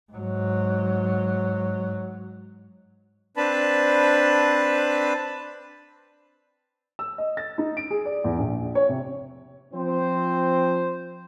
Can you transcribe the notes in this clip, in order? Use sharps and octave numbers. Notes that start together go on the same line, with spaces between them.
G#2 F#3
C4 D4 B4 A5 B5
E6
D#5
A6
D#4
D7
G#4
D5
E2
A#1
C#5
C3
F3 C4 C5